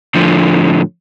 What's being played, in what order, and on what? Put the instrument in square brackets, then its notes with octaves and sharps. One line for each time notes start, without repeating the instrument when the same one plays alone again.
[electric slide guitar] A2 D3 F3